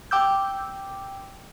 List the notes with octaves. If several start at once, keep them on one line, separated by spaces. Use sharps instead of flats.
G5 D6 E6 G6